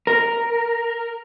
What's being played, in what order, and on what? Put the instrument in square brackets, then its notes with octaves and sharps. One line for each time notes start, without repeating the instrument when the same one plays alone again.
[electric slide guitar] A#4